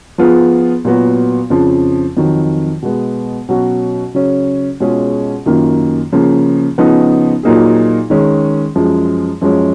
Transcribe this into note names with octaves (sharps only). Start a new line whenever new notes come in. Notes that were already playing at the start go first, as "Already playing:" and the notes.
F3 B3 F4 G#4
A#2 F#3 B3 F#4
F2 C#3 F3
F2 D#3 F#3
B2 G#3 B3
B2 F#3 C#4 F#4
C#3 F#3 C#4
B2 G#3 C#4 F4 G#4
F#2 D#3 A#3 F4
C#3 F3 A#3
C#3 F3 B3 D#4
A#2 F#3 A#3 D#4 G#4
D#3 G#3 C#4
F#2 F3 G#3
F#2 F3 G#3 C#4